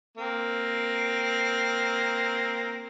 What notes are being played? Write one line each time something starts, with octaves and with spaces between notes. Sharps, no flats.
A#3 C4